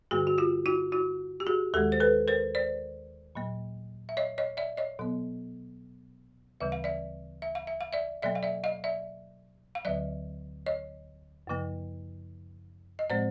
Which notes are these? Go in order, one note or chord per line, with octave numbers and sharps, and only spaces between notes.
G2 D3 G3 A#3 F#4 G#4
F#4
F4 G4
E4 F#4
E4 F#4
G4
F#4 G#4
D#2 D#3 G#3 G4 A4
C5
A4 B4
A#4 C5
C5 D5
A#2 F#3 A#3
E5
C#5 D#5
C#5 D#5
D5 E5
C#5 D#5
B2 F#3 B3
D2 C#3 E3 G3 E5
F5
D5 E5
E5
F5
E5
F5
D5 E5
B2 F#3 A#3 D5 E5
F5
D5 E5
D#5 F5
D5 E5
F5
D2 D3 F#3 D5 E5
C#5 D#5
F#2 C#3 F3 A#3
D#5
A2 F3 G#3 C4 C5 D5